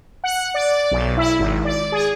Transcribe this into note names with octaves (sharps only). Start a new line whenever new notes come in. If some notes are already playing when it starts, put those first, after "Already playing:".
F#5
D5
B1
E4
G#1
D5
G#4